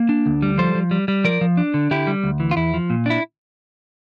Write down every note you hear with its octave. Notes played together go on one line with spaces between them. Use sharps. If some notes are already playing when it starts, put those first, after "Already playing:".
Already playing: A#3
D4
D2
G3
F3 A4 C5
F3
G3
G3
F3 A#4 D5
F3
D4
D3
D3 E4 G4
G3
D2
E3
F4
E2 E4
F3
A#2
D4 E4